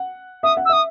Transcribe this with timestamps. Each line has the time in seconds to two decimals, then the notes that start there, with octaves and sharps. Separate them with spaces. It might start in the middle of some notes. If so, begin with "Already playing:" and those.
Already playing: F#5
0.43 E5 D#6
0.57 F#5
0.65 E6
0.69 E5 D#6